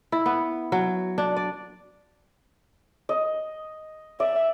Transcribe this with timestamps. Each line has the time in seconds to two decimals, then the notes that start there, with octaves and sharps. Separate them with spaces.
0.12 E4
0.26 B3
0.72 F#3
1.18 D4
1.36 D5
3.09 D#5
4.20 D5 E5